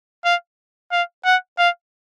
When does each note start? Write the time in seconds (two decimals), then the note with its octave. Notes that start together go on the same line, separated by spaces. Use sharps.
0.25 F5
0.92 F5
1.25 F#5
1.59 F5